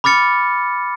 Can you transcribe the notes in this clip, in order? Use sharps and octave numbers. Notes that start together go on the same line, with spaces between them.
B5 D6 F6 A6 C#7